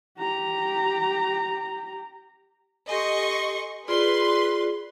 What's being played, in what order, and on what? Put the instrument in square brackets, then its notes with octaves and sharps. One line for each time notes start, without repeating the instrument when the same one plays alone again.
[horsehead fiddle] G4 A#5
[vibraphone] G4 A4 G#5 [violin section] D#5 C6 C#6
[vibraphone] F4 G#4 D5 [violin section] B4 C6